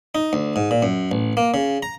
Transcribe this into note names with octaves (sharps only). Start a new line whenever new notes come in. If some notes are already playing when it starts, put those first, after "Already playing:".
D#4
D2
G#2
A#2
F#2
A1
A#3
C#3
A#5